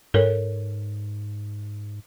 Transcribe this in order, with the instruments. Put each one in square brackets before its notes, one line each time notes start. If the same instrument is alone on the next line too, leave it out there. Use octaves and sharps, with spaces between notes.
[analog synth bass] G#2 [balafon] A4 A#4 C#5